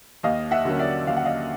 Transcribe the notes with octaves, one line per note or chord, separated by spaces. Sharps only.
D#2 D#5 F5
E5 F#5
D3 F#3 A#3 C#4
D5 E5
D#2 F5
F#5
D#5 F5